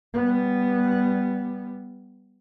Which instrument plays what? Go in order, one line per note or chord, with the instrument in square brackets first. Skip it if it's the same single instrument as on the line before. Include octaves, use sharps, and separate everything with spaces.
[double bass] G3 B3